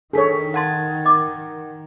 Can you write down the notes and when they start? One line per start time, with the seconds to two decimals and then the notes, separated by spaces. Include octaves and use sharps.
0.13 D#3 D4 G#4 A4 C#5 B6
0.54 F5 F#5 A5 C6 G#6 A6
1.05 D#5 D6